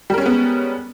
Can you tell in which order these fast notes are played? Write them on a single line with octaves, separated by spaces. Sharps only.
G3 A#4 C#4 G#3 B3